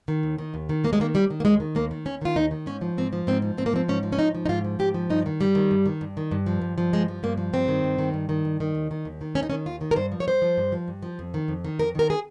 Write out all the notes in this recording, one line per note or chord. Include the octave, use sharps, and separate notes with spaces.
D#3
D#2
D#3
D#2
D#3
D#2 A#3
G#3
D#3 A#3
D#2 G3
D#3
A#3
D#2 G#3
D#3
D#2 A#3
D#3
D#2 C#4
D#3 F4
D#2 D#4
D#3
G#2 C#4
F3
G#2 C4
F3
G#2 C4
F3
G#2 C4
A#3
F3 C4
G#2 C#4
F3
C#4
G#2 D#4
F3
D#4
G#2 F4
F3
G#2 G4
F3
G2 D#4
D#3
G2 G3
D#3
G2
D#3
G2
D#3
G2
F3
G2
F3
G2 G#3
F3
G2 A#3
F3
G2 C4
D#3
G2
D#3
G2
D#3
G2
D#3
D#2
D#3
D#2
D#3
D#2 C#4
D#4
D#3 C#4
D#2 F4
D#3
A#4
G2 C5
F3
C#5
G2 C5
F3
G2
F3
G2
F3
F2
D#3
F2
D#3
F2 A#4
D#3 A#4
G#4